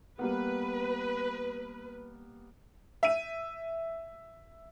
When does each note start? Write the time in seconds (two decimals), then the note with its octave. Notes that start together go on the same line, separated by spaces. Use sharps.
0.19 G3 A#3 B3 B4
3.03 E5 D#7